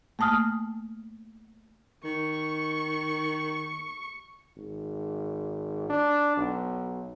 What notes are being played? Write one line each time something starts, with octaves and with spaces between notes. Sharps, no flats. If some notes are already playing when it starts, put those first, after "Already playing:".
A3 A#3 A5 D#6 F6
D#3 C#6
G#1
D4
B1